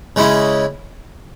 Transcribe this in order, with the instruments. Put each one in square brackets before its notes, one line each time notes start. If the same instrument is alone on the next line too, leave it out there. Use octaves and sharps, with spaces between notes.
[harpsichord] C#3 G#3 C#4 E4